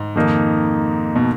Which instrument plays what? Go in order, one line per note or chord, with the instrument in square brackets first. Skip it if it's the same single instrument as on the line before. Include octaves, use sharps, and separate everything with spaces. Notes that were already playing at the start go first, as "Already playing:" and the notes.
Already playing: [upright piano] G#2
[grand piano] F2 D#3 A#3 D#4
[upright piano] B2